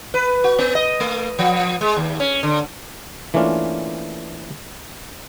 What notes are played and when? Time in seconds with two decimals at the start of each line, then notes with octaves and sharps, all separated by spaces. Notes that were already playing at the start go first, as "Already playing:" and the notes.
0.14 B4
0.44 F#4
0.59 B3
0.75 D#5
1.00 A3
1.39 F3
1.81 G#3
1.97 D#2
2.20 C#4
2.43 D3
3.34 E3 A3 A#3 C#4 D4 F4